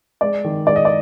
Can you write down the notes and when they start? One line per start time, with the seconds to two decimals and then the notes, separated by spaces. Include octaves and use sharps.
0.21 G#3 D5
0.44 D#3
0.67 G#3 D5
0.76 D#5
0.85 D5